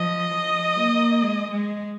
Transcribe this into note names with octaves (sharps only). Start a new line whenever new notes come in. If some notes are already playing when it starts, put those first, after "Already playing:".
Already playing: F3 D#5
F3
A#3
G#3
G#3